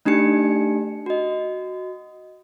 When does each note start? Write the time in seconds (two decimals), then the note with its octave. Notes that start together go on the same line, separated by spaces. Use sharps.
0.05 A3 D4 D#4 G4 C#7
1.06 F#4 D#5